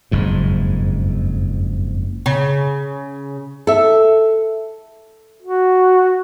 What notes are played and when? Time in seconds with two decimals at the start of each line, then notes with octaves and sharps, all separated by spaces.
0.11 F#1 F2 G#2
2.26 C#3
3.67 A4 E5
5.43 F#4